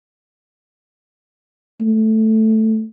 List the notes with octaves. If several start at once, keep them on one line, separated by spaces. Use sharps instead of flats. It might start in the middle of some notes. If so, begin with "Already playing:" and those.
A3